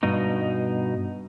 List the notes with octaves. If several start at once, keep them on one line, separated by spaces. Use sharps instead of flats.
G2 B2 D#4